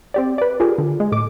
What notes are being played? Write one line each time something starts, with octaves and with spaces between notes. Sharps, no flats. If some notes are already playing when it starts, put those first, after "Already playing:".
C4 G4 D5
B4 D5
F4 G4 G#4 A#4
D3
G#3
A2 D6